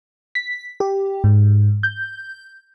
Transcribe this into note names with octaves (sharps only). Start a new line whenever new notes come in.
B6
G4
G#2
G6